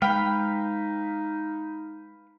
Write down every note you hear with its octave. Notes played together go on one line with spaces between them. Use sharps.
G#3 D#4 B4 F5 G5 B5